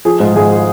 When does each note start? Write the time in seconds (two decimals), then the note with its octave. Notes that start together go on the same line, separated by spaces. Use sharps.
0.05 F3 G#4
0.20 G#2 F4
0.36 G#1 G#4